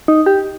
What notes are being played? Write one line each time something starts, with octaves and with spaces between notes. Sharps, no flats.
D#4
G4